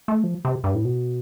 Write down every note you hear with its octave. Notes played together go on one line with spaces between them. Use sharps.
A3
F3
C3
G2
A2
B2